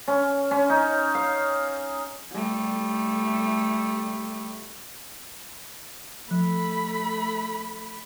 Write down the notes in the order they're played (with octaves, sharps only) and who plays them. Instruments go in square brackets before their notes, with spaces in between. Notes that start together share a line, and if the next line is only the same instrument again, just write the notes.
[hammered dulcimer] C#4
C#4
D#4
F5
[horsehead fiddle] G3 A3
[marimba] F3 [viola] A3 B5